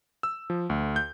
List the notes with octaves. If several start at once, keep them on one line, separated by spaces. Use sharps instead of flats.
E6
F3
D2
G6